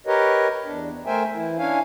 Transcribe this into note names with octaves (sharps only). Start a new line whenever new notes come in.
G4 A#4 B4 C#5 D#5
E2 D4
A3 A#4 C5 E5 G5 G#5
E3 E4
C#4 D4 E4 C#5 F5 G#5